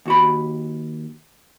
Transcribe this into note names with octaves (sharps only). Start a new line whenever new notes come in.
D#2 F#4 B5